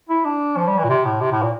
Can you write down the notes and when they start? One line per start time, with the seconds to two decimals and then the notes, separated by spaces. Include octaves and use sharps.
0.09 E4
0.25 D4
0.57 F3
0.67 G3
0.78 E3
0.84 A#2
0.89 C3
1.05 A2
1.21 C3
1.31 A2
1.42 A#2